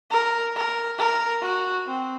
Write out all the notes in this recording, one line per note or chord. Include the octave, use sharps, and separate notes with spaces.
A#4
A#4
A#4
F#4
C4